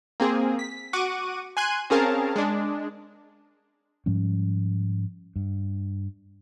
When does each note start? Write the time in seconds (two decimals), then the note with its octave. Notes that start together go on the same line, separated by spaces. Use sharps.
0.20 A#3 C4 G#4
0.59 B6
0.93 F#4 F#5 C#6 D6 D#7
1.57 G#5 C6 F#6 G#6 D#7
1.90 C4 C#4 G#4 A#4 F5 A5
2.36 G#3 D4
4.06 G#2 F3 G3 C#4
5.36 G2